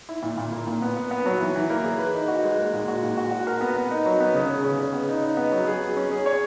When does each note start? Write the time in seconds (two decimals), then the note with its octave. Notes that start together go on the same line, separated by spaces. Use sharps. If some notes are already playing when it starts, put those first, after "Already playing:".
0.09 E4
0.23 A#2
0.38 A#2
0.52 A#3
0.67 A#2
0.82 B3
0.97 B3
1.11 B3
1.26 F#3
1.40 E3
1.56 E3
1.70 A#3
1.85 G#4
1.99 B4
2.14 D#4
2.28 F#4
2.44 G#3
2.58 A#3
2.73 A#2
2.88 F#4
3.03 A#2
3.17 F#4
3.31 F#4
3.47 A#4
3.61 B3
3.76 B3
3.91 D#4
4.06 F#3
4.20 B3
4.35 C#3
4.49 C#3
4.65 C#3
4.79 C#3
4.93 B3
5.09 D#4
5.23 D#4
5.37 B3
5.52 F#3
5.67 G#4
5.82 F#3
5.96 C#4
6.12 G#4
6.26 C#5